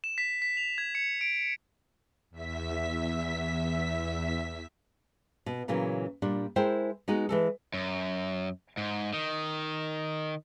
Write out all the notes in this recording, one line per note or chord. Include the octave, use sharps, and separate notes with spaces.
E7
B6
B6
F7
G#6
C#7
D7
E2 E5 B6
B2
A#2 C#3 E3 F#3 A#3
A#2 G3 D4
G#3 E4 A#4 C5 G5
G#3 B3 D#4 F#4
E3 G#3 A4
F#2
G#2
D#3